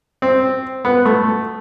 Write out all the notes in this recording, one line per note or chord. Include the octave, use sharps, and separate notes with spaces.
C4
B3
A3